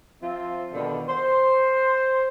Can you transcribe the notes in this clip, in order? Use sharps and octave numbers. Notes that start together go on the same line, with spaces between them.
F3 C4 F4 E5
B2 D3 D#3 G3
C5